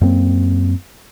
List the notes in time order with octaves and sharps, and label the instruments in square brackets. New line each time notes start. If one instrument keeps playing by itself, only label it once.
[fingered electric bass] F#2 A#3 C4